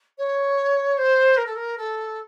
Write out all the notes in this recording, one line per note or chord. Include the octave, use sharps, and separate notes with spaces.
C#5
C5
A#4
A4
A#4
A4